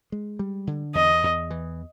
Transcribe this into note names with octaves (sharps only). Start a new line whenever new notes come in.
G#3
G3
D3
E2 D#5
E2
E3